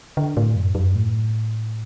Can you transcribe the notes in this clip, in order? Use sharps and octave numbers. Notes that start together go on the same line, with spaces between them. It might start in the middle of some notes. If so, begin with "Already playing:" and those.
D3
A2
F#2
F#2
A2